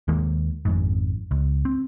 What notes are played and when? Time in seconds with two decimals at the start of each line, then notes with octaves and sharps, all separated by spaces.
0.08 D#2 D#3 G#3 A#3
0.65 G#1 F2 G#2
1.31 C#2
1.65 C4